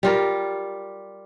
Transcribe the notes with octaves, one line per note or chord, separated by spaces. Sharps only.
G3 F4 A#4